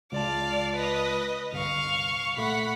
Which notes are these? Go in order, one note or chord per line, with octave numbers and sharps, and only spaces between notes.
C#2 F4 D5 F5 A5
B4 D#5
G1 C2 F5 C#6
A#2 A3 F#5 B5 C#6